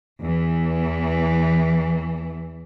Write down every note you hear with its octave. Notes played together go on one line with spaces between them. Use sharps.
E2 E3